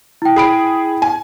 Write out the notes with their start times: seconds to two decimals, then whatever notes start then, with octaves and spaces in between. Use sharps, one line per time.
0.22 E4 G5
0.36 G#4 B5 D7
1.02 G#5